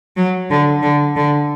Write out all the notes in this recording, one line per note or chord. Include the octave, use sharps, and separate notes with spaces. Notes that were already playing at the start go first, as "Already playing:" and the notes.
F#3
D3
D3
D3